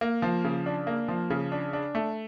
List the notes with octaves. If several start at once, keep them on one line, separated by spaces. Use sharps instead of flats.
A#3
F3
C#3
D4
A#3
F3
C#3
D4
D4
A3